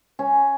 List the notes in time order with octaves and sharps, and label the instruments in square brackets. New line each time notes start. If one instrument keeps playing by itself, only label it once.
[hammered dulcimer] C#4